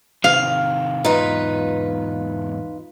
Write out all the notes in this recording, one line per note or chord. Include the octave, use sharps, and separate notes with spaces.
C3 D#3 F5
E2 G#2 D#4 F4 B4